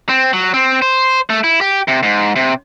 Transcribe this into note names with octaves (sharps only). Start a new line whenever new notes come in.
C4
F#3
C4
C5
A3
E4
G4
C3
G#2
C3